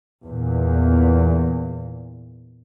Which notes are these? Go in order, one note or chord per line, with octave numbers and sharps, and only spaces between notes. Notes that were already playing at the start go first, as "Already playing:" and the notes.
E2 A#2